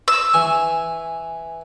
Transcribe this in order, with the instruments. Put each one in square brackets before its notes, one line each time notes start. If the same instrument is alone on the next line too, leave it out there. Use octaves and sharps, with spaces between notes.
[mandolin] E6
[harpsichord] E3 G#5 C#6